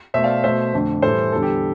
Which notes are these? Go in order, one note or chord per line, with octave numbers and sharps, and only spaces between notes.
B2 A3 C5 E5
D5 F5
B2 A3 C5 E5
F2 D3 A3
A2 E3 G3 A4 C5
E2 D3 G3 A4
G4